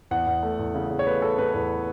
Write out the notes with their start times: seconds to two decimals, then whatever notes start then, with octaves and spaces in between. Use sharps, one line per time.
0.11 E2 F#5
0.27 E2
0.43 A3
0.59 E2
0.75 C#3
0.91 C#3
0.99 C#5
1.06 A3 B4
1.22 A3 A4
1.38 C#3 B4
1.54 E2 B4